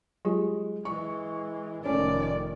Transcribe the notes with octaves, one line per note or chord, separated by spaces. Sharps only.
F#3 G#3 F4 G4
E3 G#3 C#6
F1 D#3 A3 C#4 D5